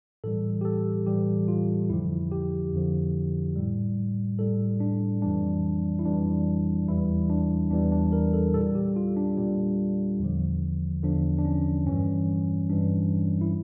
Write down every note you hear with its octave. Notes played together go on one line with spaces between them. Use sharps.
A2 E3 G3 A4
G4
A4
A2 E3 G3 G4
F4
F2 D3 F3 E4
G4
F2 D3 F3
A2 G3
A2 G3 A4
D4
F2 E3 G3 D4
E4
F2 E3 G3 D4
E2 E3 G3 E4
D4
E2 E3 G3 D4
D4
A#4
A4
A#2 G3 A4
G4
F4
D4
A#2 G3
E2 D3 F3
E2 D3 F3 D4
D4
C#4
G2 E3 G3 C#4
G2 E3 G3 D4
E4